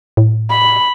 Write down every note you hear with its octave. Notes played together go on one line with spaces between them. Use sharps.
A2
B5